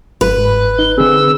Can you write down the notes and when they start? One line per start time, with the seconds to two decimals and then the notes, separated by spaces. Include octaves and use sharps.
0.21 G1 B4
0.37 G#2
0.79 D#4 G7
0.98 D3 C4 G#4 E6